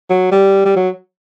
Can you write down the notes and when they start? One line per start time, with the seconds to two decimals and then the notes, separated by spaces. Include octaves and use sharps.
0.10 F#3
0.32 G3
0.65 G3
0.76 F#3